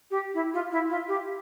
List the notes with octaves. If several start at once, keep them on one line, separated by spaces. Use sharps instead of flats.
G4
E4
F4
E4
F4
G4